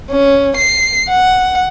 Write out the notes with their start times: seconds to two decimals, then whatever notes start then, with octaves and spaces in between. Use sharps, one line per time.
0.11 C#4
0.57 C7
1.09 F#5